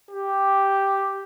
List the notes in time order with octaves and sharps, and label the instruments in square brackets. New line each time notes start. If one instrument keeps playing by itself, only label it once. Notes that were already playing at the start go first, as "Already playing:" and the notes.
[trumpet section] G4